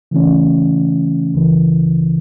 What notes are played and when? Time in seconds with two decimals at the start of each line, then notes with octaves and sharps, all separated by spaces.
0.11 C#3 E3 A3 C#4
1.34 C#2 C#3 E3